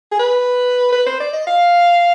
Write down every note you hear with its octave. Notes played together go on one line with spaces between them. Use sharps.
G#4
B4
B4
C5
D5
D#5
F5